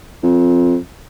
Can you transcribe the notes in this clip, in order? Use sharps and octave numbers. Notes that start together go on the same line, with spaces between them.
F2